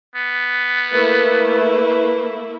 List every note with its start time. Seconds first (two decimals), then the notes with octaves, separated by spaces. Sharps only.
0.16 B3
0.90 A3 A#3 E4 B4